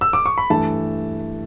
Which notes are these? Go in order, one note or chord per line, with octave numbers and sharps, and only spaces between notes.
E6
D6
C#6
B5
G2 E3 A3 A5